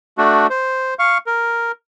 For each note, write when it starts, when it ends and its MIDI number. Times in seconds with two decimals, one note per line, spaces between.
0.18 0.47 57
0.18 0.47 62
0.18 0.47 66
0.50 0.94 72
0.99 1.18 77
0.99 1.18 85
1.26 1.72 70